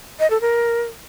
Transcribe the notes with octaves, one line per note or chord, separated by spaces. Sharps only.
D#5
A4
A#4